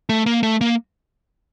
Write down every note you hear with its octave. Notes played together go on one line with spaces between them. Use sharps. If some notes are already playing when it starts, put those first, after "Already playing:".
A3
A#3
A3
A#3